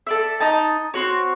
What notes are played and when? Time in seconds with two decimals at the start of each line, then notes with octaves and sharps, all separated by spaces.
0.07 A4 D5 E5
0.41 D#4 D#5 A5
0.94 C4 F#4 C#5